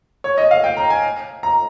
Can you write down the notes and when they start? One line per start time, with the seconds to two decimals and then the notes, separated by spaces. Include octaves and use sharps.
0.24 C#5
0.38 D#5
0.51 F5
0.64 G5
0.77 A#5
0.90 G#5
1.43 A#5